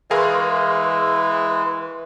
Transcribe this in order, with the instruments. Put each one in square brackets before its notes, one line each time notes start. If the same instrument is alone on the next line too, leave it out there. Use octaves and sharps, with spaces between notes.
[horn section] E3 [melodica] G#3 [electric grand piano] G#4 A#4 F5 [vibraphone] B4 C6 C#6